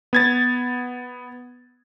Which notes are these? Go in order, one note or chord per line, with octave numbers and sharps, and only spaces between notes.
B3 G#6 A6